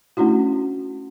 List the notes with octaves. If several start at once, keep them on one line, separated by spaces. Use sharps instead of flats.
A3 C#4 D4 E4 F#4